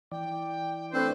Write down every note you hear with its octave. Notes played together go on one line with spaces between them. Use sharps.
E3 D5 G5
A3 C4 D4 B4 C5